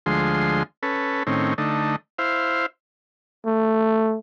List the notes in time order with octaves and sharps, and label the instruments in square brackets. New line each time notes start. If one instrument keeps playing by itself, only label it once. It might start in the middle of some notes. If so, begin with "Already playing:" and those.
[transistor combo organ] D2 F3 G#3 C6
C#4 A4 B4
A2 D#3 C4 C#4
D3 A3 D#4
E4 C5 F5
[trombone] A3